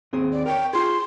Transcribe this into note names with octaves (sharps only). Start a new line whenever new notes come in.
D#2 C4 G#4
D5
A#4 C#5 G5
F4 G#4 C6